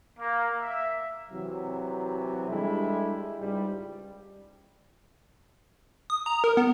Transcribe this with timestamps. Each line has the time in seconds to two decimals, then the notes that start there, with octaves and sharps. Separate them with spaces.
0.20 A#3
0.61 E5
1.31 C3 E3 F#3
2.49 G3 G#3 D4 E4 A4
3.39 C#2 G#2 G3
6.10 D#6
6.26 A#5
6.44 A#4
6.57 B3